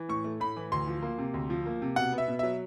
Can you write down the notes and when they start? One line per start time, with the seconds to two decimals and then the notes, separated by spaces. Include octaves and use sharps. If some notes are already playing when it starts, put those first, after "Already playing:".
Already playing: E3
0.09 A2 C#6
0.24 A3
0.40 A2 B5
0.57 E3
0.72 D2 C6
0.88 F3
1.03 A#3
1.18 C3
1.34 D2
1.50 F3
1.66 A#3
1.82 C3
1.96 B2 F#5
2.12 B3
2.18 E5
2.28 B2
2.39 F#3 E5